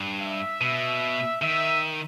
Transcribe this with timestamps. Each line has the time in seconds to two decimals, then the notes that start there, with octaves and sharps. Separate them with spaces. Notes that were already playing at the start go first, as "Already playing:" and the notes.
Already playing: G2
0.21 E5
0.61 B2
1.42 D#3 E5